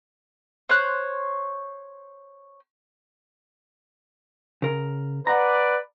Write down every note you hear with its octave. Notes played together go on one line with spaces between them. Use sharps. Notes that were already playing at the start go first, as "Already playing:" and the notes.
C5 C#5 F#6
C#3 A#4
B4 D5 F#5 A#5